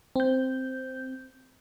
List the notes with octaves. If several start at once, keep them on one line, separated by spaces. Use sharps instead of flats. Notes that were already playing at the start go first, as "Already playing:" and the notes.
C4 G6